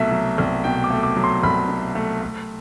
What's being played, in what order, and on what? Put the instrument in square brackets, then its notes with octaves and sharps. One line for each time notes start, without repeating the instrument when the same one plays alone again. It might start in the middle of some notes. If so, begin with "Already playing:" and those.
Already playing: [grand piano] C2 B2 F#3 A3 E5
F#3
C2
B2 G5
D6
A3
D6
F#3
C6
C2 B5
B2
A3
A3